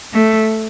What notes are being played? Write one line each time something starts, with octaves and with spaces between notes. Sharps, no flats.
A3